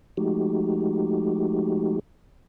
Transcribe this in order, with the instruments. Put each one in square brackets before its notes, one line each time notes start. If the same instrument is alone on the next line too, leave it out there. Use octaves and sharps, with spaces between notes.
[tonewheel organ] F3 G#3 A3 D#4 F#4 G4